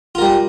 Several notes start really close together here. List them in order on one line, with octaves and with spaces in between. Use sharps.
F4 A#4 G3